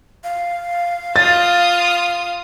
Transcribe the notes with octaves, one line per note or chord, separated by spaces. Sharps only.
F5
F4 D#6 A6